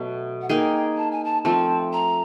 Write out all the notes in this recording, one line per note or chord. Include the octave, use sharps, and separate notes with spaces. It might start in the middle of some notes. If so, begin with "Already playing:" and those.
Already playing: B2 F#3 A3
F#5
A#3 D#4 G#4 G5
A5
G#5
A5
F3 A3 C4 A5
A#5